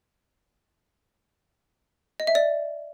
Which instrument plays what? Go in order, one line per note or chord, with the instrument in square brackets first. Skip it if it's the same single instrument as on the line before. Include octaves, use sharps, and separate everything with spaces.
[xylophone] D#5
E5
D5